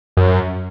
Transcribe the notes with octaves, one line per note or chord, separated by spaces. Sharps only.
F#2